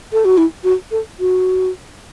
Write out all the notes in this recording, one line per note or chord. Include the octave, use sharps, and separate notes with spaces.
A4
F#4
E4
F#4
A4
F#4